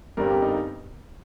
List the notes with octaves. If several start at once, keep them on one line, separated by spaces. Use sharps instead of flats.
G1 G2 G3 C4 A#4
G4
D#4